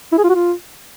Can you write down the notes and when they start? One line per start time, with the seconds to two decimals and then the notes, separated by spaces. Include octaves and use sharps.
0.12 E4
0.18 G#4
0.24 F4
0.29 F#4
0.35 F4